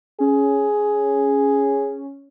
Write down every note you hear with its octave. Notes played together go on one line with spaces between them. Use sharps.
C#4 G#4